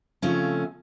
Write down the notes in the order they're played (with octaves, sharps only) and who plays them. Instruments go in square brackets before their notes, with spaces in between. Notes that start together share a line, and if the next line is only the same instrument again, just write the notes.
[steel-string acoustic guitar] C#3 F3 A3 C4 C#4